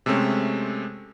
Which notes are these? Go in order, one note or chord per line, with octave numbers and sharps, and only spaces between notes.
C3 G#3 A3 C4 C#4